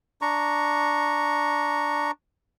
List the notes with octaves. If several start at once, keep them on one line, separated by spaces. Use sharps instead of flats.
D4 A#5 C#6